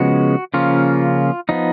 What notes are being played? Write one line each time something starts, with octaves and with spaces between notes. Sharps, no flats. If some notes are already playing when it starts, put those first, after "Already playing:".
Already playing: C#3 F3 G#3 B3 F#4
C#3 F3 A#3 C#4 F4
F3 B3 D#4